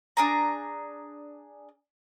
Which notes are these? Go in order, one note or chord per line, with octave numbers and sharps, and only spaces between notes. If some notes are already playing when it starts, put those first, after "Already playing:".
D4 G#4 A#5